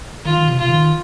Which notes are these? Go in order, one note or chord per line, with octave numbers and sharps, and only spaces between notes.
D#3 F4
D#3
C3
C3 F4
D#3